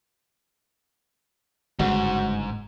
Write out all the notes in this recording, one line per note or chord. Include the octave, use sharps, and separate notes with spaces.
G1 G#2 C#3 F#4